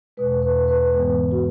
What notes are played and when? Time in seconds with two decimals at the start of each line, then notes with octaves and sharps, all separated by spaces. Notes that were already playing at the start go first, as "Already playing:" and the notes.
0.17 E2 B2 G#3 B4
0.42 B4
0.68 B4
0.93 G#2 E3 G#3 B3 B4
1.31 F#4